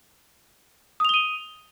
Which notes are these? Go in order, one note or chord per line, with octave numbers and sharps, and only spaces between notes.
D#6 D#7 F7 G7